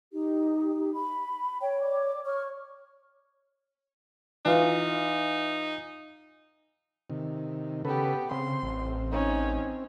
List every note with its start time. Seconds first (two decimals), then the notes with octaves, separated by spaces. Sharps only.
0.13 D#4 G4
0.93 B5
1.61 C#5 G5
1.81 D5 D6
2.25 C#5 C#6 F6
4.45 E3 D#4 F4
7.10 C3 D#3
7.85 C#3 B3 G4 A4 B4
8.31 C#3 C4 C6
8.63 A1
9.11 C#4 D#4